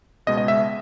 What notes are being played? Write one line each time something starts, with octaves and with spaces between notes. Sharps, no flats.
C#2 B2 G#3 D#5
D#5
E5